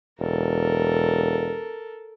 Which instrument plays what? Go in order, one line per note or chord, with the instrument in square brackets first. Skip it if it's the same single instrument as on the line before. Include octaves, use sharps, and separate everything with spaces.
[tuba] E1 [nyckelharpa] A4 A#4